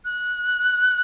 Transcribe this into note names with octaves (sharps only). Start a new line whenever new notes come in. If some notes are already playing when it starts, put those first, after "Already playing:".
F#6